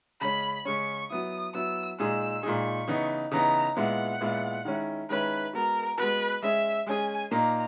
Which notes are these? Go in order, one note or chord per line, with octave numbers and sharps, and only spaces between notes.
C#3 G#3 C#4 B5
C#3 G#3 C#4 C#6
F#3 B3 E4 D#6
F#3 B3 E4 E6
A#2 G#3 D#4 G#4 E6
A#2 G#3 D#4 G#4 C#6
C#3 E3 B3 D#4
C#3 E3 B3 D#4 A#5
A#2 G#3 B3 E4 F#5
A#2 G#3 B3 E4
D#3 G#3 C#4 E4
D#3 G#3 C#4 E4 B4
G#3 B3 F#4 A#4
G#3 B3 F#4 B4
G#3 C#4 G#4 E5
G#3 C#4 G#4 G#5
A#2 A#3 D#4 A#5